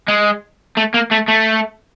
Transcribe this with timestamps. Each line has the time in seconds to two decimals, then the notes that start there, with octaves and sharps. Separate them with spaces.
0.08 G#3
0.77 A3
0.94 A#3
1.11 A3
1.28 A3